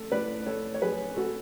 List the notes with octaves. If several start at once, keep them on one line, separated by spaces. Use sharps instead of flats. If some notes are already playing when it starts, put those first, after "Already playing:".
Already playing: A3 A4
A2 B4 D5
A2 A4 C#5
C#5
F#3 G#4 B4
A3 F#4 A4